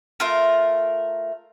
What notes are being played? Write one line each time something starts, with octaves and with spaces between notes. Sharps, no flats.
A3 F4 A#4